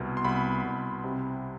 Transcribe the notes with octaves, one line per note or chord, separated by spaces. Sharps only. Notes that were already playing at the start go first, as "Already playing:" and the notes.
Already playing: C2 B2
C6
C2 B5
C2
C3